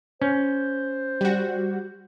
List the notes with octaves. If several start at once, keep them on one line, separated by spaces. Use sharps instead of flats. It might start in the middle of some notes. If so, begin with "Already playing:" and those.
C#4 C5
G3 F#4